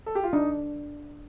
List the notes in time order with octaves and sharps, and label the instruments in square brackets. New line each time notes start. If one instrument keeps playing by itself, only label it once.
[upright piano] A4
G4
F4
[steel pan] D4 [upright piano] D#4